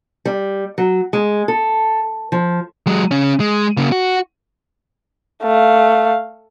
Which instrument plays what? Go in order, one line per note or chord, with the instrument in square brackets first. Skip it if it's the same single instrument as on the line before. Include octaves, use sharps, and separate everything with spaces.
[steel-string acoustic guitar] G3
F#3
G#3
A4
F3
[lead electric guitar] F#3 G#3
C#3 C#4
G#3
C#3 A#3
F#4
[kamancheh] A3 F5